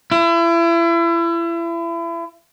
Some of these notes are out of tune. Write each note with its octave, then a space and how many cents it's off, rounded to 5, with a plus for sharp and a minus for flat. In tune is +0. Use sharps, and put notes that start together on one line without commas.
E4 +35